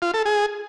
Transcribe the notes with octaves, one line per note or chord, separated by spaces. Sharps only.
F4
A4
G#4